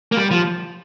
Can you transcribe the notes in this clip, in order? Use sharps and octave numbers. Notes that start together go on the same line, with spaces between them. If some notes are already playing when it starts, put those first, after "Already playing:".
A#3
G3
F3